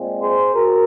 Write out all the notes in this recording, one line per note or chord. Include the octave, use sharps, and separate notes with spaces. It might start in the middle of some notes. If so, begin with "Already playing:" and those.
Already playing: A#2 G#3 C4
G#4 C5
F#4 A#4